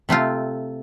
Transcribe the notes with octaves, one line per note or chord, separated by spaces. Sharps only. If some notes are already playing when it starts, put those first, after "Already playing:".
C3 A3 C4 F4